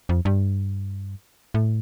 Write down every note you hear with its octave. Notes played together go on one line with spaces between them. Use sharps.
F2
G2
A2